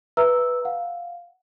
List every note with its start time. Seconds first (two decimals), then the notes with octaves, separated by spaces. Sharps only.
0.17 B4 E5 A#5 E6 F6
0.65 F5 F#5